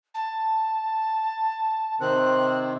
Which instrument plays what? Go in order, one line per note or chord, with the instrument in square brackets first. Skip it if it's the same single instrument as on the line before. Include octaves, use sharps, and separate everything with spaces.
[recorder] A5
[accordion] C3 D#3 C4 [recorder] F#6